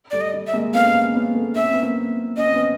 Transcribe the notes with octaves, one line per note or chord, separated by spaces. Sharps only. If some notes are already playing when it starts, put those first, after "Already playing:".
G3 A3 D5
D#5
G3 A3
E5
G#3 A#3
A3 B3 F5
C#4
A#3 C4
B3 C#4
A3 B3
C#4 E5
C4
B3
A#3 C4
C#4 D#5
C4
B3 C#4